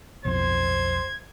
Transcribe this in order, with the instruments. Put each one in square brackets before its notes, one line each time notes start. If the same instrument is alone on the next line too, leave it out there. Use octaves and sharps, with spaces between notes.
[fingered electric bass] B1 F2 [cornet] C5 [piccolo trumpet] G#6